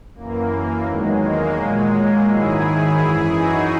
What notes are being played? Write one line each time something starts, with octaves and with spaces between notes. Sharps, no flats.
F#2 E3 A#3
E2 D#3 F#3 G#3
A#3
A#2 F#3 G#3
A#3
G#2 D#3 F#3 E4 G#4
E4 G#4
F#2 E3
D#4 F#4